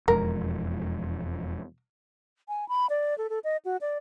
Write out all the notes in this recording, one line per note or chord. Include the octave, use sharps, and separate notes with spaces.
E1 F2 G#3 A#4
G#5
B5
D5
A4
A4
D#5
F#4
D5